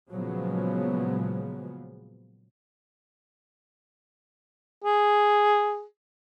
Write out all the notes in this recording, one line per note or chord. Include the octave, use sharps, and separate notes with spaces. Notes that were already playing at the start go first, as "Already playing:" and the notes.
A#2 C#3 F3 F#3 G#3 B3
G#4